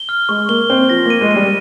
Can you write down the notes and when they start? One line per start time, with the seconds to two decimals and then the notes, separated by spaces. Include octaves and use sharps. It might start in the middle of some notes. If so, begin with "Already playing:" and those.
Already playing: G7
0.09 F6
0.29 G#3 C#6
0.49 A#3 G7
0.70 C4 G7
0.89 F3 A#6
1.06 A#3 D#7
1.21 G#3
1.31 G3 D#7